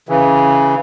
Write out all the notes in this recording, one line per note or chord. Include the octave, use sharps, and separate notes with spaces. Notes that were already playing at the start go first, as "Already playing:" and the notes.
C#3 E3